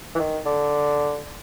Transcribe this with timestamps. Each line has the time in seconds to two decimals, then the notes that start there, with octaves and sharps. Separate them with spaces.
0.15 E3
0.19 D#3
0.45 D3